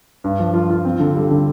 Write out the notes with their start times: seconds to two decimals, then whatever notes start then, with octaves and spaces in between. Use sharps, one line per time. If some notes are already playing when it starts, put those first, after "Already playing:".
0.24 G2
0.40 F3
0.54 F4
0.70 F4
0.85 C4
1.00 D3
1.15 G3
1.30 D3